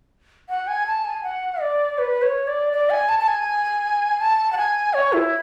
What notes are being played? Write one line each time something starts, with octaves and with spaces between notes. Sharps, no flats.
F#5
G#5
A5
G#5
F#5
D5
B4
C#5
D5
D5
G#5
A5
A5
G#5
A5
F#5
G#5
C#5
E4